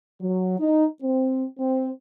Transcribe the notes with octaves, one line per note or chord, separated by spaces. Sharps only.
F#3
D#4
C4
C4